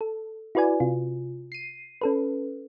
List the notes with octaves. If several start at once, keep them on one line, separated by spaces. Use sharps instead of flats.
A4
E4 F#4 B4 D5 G#5
C3 F4
C7 D#7
C#4 A4 B4